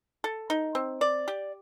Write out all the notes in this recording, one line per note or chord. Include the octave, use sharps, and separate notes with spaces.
A4
D#4
C4
D5
G4